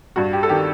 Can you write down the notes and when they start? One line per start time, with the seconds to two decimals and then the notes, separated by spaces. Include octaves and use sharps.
0.16 G2 F#4
0.33 G4
0.43 A4
0.49 D#3 G4